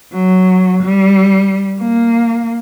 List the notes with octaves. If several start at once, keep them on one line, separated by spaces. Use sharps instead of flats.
F#3
G3
A#3